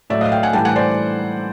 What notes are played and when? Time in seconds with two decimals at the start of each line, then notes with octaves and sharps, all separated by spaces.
0.10 A2 F#3 D5 E5
0.21 D#5 F5
0.32 F5 G5
0.43 F#5 G#5
0.53 A2 E3 G3 G5 A5
0.65 F#5 G#5
0.76 C5 D5